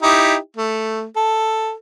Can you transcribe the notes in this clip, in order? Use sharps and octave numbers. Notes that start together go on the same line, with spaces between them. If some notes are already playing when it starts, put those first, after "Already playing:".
D#4 E4 G4
A3
A4